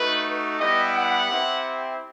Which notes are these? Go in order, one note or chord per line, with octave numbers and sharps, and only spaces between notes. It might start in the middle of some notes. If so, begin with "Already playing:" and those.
Already playing: A3 D#4 F#4 B4
G3 B3 E4 G4 D#5
F#5
C4 E4 G4